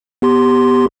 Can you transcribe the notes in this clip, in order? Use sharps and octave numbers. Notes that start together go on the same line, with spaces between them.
B3 G4 C6